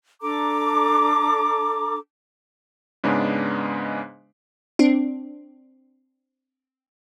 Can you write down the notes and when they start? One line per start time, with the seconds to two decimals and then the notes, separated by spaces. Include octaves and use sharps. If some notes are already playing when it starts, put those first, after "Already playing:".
0.22 D4 A4 A#5 D6
3.04 G#2 C#3 G#3 B3 D4
4.79 C4 D4